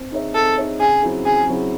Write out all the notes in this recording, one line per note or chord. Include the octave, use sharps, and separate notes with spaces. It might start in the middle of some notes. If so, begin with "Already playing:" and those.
Already playing: C4
D#4 G#4 C#5 E5
C4 A4
D#4 G#4 C#5 E5
C#3 G#4
F#3 C4 E4 G#4
C#3 G#4
F#3 C4 E4 G#4